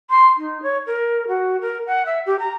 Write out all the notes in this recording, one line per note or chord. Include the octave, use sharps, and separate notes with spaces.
C6
D#4
C#5
A#4
F#4
A#4
F#5
E5
G4
A#5